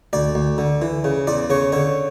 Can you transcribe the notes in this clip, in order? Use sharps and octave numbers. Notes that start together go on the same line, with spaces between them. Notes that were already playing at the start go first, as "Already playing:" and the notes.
D2 D5
D2
D3
E3
C#3
E2 D5
C#3 C#5
D3 C#5